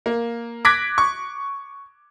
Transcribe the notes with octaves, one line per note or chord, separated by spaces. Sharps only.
A#3
D6 F#6 G#6 A#6 B6 D7
C#6